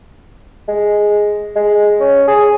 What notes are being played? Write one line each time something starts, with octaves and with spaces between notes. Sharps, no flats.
G#3
G#3
C#4
G#4